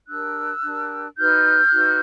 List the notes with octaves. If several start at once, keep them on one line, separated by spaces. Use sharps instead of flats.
D4 G4 A#4 E6 F#6
D4 G4 A#4
D#4 F#4 B4 F6 G6
D#4 F#4 B4